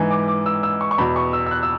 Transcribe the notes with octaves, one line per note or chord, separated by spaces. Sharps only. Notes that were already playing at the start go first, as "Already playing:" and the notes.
Already playing: G#2 E3 G#5
D6
D6
E6
E6
C#6
C#6
E2 B2 B5
C#6
E6
E6
F#6
E6